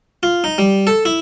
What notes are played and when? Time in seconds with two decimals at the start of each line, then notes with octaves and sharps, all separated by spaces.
0.23 F4
0.44 D#4
0.58 G3
0.87 A4
1.05 E4